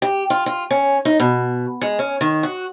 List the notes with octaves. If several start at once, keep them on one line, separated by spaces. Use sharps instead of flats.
G4
F4
F4
C#4
D#4
B2
G#3
C#4
D#3
F#4